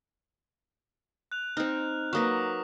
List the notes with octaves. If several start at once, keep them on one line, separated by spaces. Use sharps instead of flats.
F#6 F7
C4 D#4 F6
F#3 A#3 B4 C#6 D#6 A#6